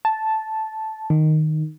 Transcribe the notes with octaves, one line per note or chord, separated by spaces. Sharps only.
A5
D#3